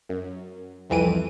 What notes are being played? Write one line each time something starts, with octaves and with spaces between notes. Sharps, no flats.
F#2
C2 F2 E3 D7 D#7